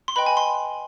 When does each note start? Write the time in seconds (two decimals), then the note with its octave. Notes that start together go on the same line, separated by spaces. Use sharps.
0.08 C6
0.16 B4 D#5 G5 B5
0.26 G#5
0.37 C6